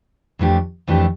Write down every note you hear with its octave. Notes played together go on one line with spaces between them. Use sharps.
F2 E3 A3 D4 G4
F2 E3 A3 D4 G4